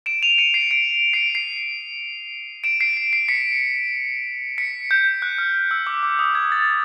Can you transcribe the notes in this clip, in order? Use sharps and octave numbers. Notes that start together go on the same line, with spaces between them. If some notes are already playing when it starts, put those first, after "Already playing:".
D7 E7
D#7 F7
C#7 D#7
C7 D7
C7 D7
C7 D7
C7 D7
D7 E7
C7 D7
C7
C7
B6 C#7
B6 C#7
G6
F#6
F6
E6
D6
D6
D#6
G#6
A6